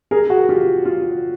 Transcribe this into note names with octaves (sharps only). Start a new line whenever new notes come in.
G#4 A#4
F#4 G#4
F4 G4
F4